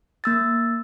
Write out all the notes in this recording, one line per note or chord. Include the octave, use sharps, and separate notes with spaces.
A#3 E6 A6